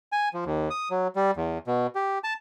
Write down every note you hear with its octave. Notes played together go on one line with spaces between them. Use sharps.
G#5
F3
D#2
D#6
F#3
G3
E2
B2
G4
A5